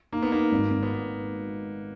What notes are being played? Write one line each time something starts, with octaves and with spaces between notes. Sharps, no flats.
A#3 D#4
B3
A#3 D#4
G#1
G#1
B3